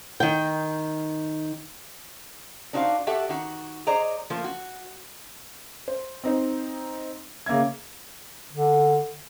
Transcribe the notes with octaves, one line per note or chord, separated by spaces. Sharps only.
D#3 G5
D4 D#4 F#4 C5 D#5 F5
F#4 G4 A4 E5 F#5
D#3 F#4
G#4 C5 D5 D#5 A#5
F3 A3 A#3
F#4
C5
C4 D#4 C5
C#3 A#3 E5 G#6
D3